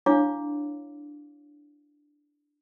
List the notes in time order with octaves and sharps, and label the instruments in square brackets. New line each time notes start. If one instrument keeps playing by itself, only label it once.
[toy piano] D4 E4 C#5 F5 D6